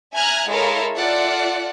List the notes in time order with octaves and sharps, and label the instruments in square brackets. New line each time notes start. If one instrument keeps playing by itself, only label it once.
[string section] E5 G#5 A#5 F6 F#6 G#6
G#3 E4 A4 A#4 C#5 F5
F4 A4 D5 E5 F#5